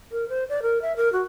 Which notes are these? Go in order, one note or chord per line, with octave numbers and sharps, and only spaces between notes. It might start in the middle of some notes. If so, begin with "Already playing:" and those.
A#4
C5
D5
A#4
E5
A#4
F#4